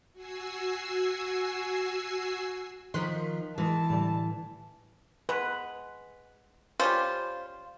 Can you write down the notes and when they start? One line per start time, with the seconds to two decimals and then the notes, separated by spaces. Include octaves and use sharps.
0.13 F#4 G#5 E6 C7
2.94 D#3 F3 A#4 D#5 C6 F#6 B6
3.58 B2 E3 G#3 A5
3.90 A2 D3 G3
5.29 G#3 B4 F#5
6.80 G3 C#4 F4 C5